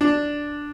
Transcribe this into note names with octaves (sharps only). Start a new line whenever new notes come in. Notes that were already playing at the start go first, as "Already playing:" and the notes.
D4